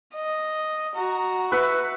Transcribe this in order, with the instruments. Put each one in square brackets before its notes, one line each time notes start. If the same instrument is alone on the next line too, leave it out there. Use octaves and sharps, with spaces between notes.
[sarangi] D#5
[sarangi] F#4 [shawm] A#5
[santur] B4 F#5 [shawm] E5